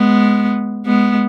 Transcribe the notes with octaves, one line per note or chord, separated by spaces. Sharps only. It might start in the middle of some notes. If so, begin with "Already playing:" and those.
Already playing: G#3 B3
G#3 B3